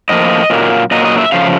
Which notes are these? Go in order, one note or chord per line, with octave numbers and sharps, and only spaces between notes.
A2 F3 A#3 D#5
A#2 F#3 A#3
A#2 F#3 A#3 D#5
D#5
E5
C#3 F3 A3 F5